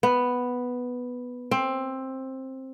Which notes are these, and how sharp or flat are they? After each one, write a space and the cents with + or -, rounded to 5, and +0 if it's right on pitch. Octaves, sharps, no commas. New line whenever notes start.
B3 +0
C4 +15